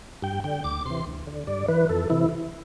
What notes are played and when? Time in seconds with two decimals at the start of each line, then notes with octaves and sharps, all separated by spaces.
0.22 G2 G5
0.44 D3 G5
0.64 D2 D6
0.85 C3 E3 C6
1.06 D2
1.27 D3
1.47 G2 D5
1.68 E3 B4
1.89 F2 A4
2.10 C3 E3 E4